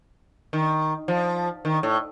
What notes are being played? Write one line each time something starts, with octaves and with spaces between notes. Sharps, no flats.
D#3
F3
D#3
A2